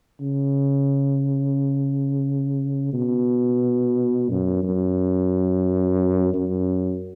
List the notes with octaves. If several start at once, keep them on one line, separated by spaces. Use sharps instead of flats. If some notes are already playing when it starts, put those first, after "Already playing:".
C#3
B2
F#2
F#2
F#2